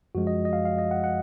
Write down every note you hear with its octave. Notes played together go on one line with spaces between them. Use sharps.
F#2 F3 G#3 F#4
D#5
D#5
F5
F5
D#5
F#5
F#5